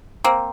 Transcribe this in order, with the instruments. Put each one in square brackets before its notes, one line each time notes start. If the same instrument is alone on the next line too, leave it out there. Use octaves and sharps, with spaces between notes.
[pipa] A#3 C4